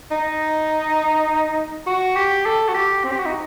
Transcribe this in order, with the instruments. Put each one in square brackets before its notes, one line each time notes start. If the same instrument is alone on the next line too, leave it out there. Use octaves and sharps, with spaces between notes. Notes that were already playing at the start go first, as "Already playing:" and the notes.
[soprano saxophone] D#4
F#4
G4
A4
F#4
G4
C4
G4
F#4
D#4